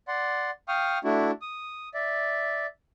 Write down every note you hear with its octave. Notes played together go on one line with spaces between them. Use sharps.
D5 F#5 C6
F5 G5 C#6 D#6 F6
A3 D4 E4 F#4
D#6
D5 E5